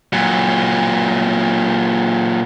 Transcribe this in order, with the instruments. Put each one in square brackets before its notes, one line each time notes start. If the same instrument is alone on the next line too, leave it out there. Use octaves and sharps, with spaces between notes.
[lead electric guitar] A#2 F#3